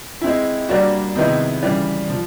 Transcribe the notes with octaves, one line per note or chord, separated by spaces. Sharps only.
G#3 C4 E4
G3 A#3 D4 F#4
C3 D#3 G#3 B3 E4
C#3 E3 G3
F3